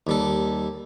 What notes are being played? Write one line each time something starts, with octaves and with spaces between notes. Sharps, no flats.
D#2 G3 A4